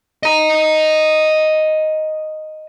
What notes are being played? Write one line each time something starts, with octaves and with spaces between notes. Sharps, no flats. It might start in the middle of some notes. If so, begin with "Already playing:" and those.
D#5 A#5